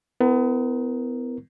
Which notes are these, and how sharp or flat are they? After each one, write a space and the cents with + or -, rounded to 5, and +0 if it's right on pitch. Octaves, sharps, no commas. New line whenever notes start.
B3 +35 E4 +0 A#4 +0